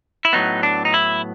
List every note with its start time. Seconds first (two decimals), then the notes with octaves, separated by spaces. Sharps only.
0.25 E4
0.33 A2 F#3 B3 D#4
0.63 D4
0.85 D#4
0.94 E4